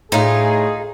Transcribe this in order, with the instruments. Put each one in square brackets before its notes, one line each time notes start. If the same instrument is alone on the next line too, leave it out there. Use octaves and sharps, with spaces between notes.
[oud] A2 [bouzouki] D#4 F4 [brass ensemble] G#4